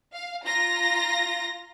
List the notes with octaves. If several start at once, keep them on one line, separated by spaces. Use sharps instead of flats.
F5
F4 A#5 A#6